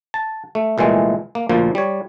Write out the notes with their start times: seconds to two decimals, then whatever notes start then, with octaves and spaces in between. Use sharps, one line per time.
0.14 A5
0.55 A3
0.78 C2 A#2 E3 G#3 A3
1.35 A#3
1.49 D2 A#2 F3 A#3
1.75 G3 C#5